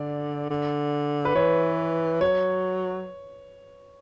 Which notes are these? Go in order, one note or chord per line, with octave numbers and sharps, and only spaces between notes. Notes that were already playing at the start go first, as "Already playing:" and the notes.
Already playing: D3 D5
D3
B4
E3 C#5
F#3 C#5